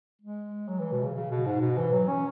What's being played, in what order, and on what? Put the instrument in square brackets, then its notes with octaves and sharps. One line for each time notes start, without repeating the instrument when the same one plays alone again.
[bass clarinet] G#3
F#3
E3
B2
C#3
C#3
B2
G#2
B2
E3
F#3
C#4